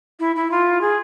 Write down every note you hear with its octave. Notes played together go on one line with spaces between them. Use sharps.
E4
E4
F4
G#4